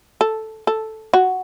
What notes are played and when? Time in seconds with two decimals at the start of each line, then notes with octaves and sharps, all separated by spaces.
0.21 A4
0.67 A4
1.14 F#4